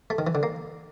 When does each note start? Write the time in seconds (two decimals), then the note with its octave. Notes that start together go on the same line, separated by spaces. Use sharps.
0.10 A3
0.18 D#3
0.27 E3
0.35 D3
0.43 A#3